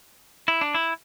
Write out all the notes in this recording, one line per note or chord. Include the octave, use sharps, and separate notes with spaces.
E4
D4
E4